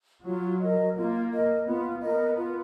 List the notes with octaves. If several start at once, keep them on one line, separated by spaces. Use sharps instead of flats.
F#3 F4
A#4 D#5
A#3 F4
A#4 D#5
B3 F4
B3 A#4 D#5
F4